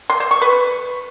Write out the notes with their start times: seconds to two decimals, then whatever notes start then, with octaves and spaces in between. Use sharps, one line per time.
0.10 C6
0.20 C5
0.31 C#6
0.41 B4